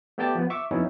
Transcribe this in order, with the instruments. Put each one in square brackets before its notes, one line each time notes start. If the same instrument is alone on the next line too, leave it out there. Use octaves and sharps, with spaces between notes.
[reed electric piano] A3 B3 G4 D5 G5 A5
F3 B3
E5 C#6 D6
F2 F#3 B3 C#4 D#4 E4